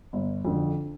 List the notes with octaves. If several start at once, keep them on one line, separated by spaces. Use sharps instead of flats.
G1
F2 D3